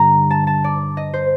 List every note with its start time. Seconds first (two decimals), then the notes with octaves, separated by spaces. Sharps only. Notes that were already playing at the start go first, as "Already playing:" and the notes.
Already playing: G2 D3 A#5
0.31 A5
0.47 A5
0.64 D5
0.97 D#5
1.14 C5